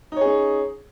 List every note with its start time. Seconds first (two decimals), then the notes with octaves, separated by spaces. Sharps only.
0.12 D#4
0.17 C#5
0.21 G#4
0.26 C#4